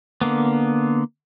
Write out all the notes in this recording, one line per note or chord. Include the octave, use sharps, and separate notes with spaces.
D3 A#3 B3